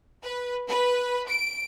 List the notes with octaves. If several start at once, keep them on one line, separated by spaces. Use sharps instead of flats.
B4
B4
D7